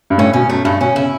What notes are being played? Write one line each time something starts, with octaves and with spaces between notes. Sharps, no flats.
G2
A2 C#4
B2 C#4
F#2 A3
G2 A3
B2 C#4
C#3 E4